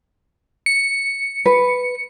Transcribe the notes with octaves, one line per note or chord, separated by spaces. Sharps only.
C#7
B4